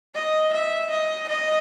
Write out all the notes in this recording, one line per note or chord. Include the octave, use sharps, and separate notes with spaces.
D#5
E5
D#5
D#5